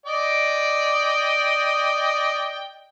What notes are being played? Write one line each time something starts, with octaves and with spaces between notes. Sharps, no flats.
D5 D#5 G5